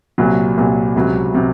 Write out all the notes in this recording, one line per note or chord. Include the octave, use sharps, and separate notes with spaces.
C2 A#2 F#3
C2 A#2 F#3
C#2 C3 F#3
C3 F#3